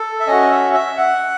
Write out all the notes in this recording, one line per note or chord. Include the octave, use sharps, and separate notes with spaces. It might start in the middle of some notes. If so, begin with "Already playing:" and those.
Already playing: A4
E5
C#4 F#4 D#5
E5
E5
F#5